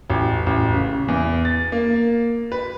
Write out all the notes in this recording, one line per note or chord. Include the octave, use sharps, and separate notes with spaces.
A1
A1
C#3
E2
A6
A#3
B4